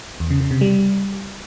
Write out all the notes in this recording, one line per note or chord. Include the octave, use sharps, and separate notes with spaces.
E2
C#3
C#3
C3
G3